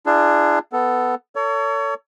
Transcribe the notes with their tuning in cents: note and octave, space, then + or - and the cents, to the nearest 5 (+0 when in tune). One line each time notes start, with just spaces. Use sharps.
D4 +15 F4 -45 G#4 +0
B3 +10 A4 +0
A4 +35 C#5 +30